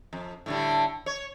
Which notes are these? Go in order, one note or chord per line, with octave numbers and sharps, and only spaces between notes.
F2
A2 D3 G3
C#5